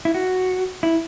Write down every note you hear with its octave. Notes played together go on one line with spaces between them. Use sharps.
E4
F#4
E4